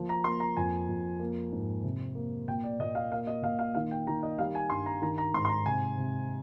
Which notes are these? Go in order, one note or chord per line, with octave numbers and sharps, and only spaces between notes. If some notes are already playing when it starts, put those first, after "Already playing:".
Already playing: F3 A#3
A#5
A#3 C6
A#5
F2 G#5
F2
A#3
G#2
C3
A#3
A#2 G5
D5
A#2 D#5
F5
A#3 F5
D#5
A#2 F5
F5
D#3 F5
G5
D#3 A#5
D#5
G3 F5
G#5
G2 C6
A#5
D#3 A#5
A#5
G#2 C6
C6
A#5
C3 G#5
C3